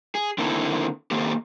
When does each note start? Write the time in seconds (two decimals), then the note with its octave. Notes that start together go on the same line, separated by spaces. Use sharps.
0.15 G#4
0.38 D3 D#3 A#3 C4 E4 A4
1.11 D#3 A#3 C4 G4 A4